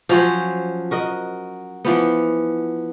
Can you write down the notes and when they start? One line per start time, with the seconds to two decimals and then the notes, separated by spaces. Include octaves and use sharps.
0.09 F3 F#3 C#4 C5
0.91 F#4 A#4 D#5
1.85 E3 F3 B3